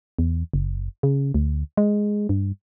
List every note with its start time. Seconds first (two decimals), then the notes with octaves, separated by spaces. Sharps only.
0.19 E2
0.54 F#1
1.03 C#3
1.34 D2
1.77 G#3
2.29 G2